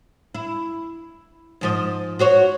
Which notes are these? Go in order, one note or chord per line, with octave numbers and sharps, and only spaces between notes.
E4
G#2 F3 D#5
F#4 C5 C#5